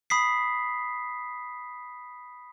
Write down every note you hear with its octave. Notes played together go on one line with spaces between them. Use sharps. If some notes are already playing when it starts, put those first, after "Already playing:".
B5 D#6 B6 C7